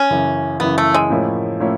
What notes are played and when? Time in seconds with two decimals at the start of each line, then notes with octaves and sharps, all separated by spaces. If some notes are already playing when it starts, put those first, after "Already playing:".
Already playing: C#4
0.10 F#2 C#3 E3
0.60 F#2 C#3 E3 B3
0.78 A3
0.94 G#3
1.10 A2 F3 A#3 C#4 E4
1.60 A2 F3 A#3 C#4 E4